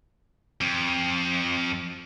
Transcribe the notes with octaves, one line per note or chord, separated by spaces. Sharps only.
F2